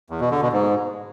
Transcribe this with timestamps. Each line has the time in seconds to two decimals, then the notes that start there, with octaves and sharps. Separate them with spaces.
0.10 E2
0.21 B2
0.31 D3
0.42 B2
0.52 G#2